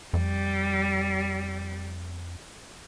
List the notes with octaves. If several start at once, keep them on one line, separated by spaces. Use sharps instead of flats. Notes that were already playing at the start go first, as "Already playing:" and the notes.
F2 G3